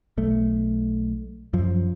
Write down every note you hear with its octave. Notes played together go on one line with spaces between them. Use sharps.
B1 A3
F#2 F3